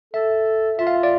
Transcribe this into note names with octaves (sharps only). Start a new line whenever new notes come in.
A4 E5
F4 E5
F5
D5